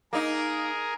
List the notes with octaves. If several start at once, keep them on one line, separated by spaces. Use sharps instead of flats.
A#3 D#4 G#4 A#4